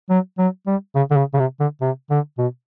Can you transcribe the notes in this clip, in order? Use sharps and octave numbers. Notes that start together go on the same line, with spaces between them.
F#3
F#3
G3
C#3
D3
C#3
C#3
C3
D3
C3
D3
B2